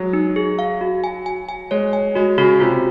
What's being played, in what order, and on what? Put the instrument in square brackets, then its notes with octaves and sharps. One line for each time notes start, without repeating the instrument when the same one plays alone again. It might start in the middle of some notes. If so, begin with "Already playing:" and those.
Already playing: [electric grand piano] F#3 G#3
[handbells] D#4
G#4
F5
F#4
G#5
G#5
G#5
[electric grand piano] G#3 [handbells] C#5
[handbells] G#5
[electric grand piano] G#3 [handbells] F#4
[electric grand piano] C#3 [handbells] F#4
[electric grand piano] C3 [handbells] F4